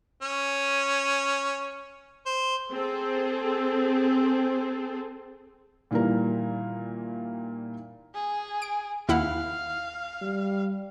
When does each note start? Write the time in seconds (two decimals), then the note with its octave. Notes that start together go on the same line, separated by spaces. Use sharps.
0.22 C#4
2.26 C5
2.73 C4 G#4 A4
5.91 A#2 D#3 E3 G3 A#3 A#4
8.14 G#4
8.62 D7
9.09 D#2 E4 F5 F#5
10.22 G3